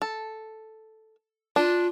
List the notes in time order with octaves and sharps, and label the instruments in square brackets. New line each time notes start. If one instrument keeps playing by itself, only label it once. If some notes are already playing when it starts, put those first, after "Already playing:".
[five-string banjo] A4
[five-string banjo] D4 [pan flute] F4